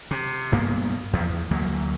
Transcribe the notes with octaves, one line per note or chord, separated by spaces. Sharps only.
C3
B1 G2 A#3 B3
E2 F3
D2 E3 F#3 A#3